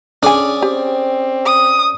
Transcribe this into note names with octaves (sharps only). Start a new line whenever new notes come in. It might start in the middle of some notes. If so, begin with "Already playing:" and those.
C#4 D4 G#4 D5 G#5
C4 G4
D#6